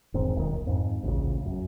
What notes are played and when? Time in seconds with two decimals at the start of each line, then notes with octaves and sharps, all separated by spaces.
0.14 E1 G#2 D#3 C4
0.36 D#1 B1 B2 D#3
0.67 F2 G#2
1.03 A1 D2 A#2 C#3
1.46 F#2